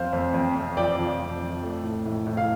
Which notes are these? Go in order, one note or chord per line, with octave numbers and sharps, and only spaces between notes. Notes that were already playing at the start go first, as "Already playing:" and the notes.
Already playing: F2 C5 F5
F2
F2
F2
F3 D5 G5
F3
F2
F3
A3
A2
A2
A2
F5